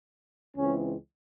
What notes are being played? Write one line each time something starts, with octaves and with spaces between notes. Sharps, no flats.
C#2 C#3 E3 G#3 C4 C#4